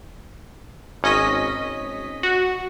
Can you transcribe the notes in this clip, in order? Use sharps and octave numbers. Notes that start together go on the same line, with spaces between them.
G#1 C#4 D#5 B6
F#4